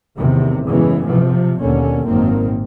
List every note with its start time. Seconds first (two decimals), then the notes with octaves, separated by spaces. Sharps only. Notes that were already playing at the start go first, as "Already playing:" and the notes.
0.17 E2 A2 C3 D#3
0.66 F#2 A2 C#3 E3 G#3 B3
1.06 C3 F3
1.59 D#2 B2 D3 A#3 C#4
2.05 G#1 F#2 A#2 D#3 A#3 C4